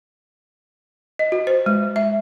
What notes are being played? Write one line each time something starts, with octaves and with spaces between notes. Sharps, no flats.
D#5
F#4
C5
G#3
E5